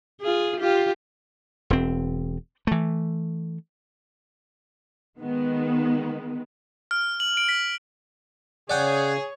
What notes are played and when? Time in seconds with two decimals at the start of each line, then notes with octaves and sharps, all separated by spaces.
0.21 F4 G#4
0.60 F4 G4
1.70 E1 C4
2.67 E3 A3
5.19 D#3 G#3 B3
6.91 F6
7.20 F#7
7.37 D7
7.49 B6
8.70 C#3 G#4 C#5 D5 F#5 G5